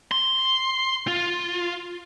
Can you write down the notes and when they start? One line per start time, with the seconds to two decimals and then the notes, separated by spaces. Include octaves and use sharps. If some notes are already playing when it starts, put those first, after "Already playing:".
0.11 C6
1.08 F4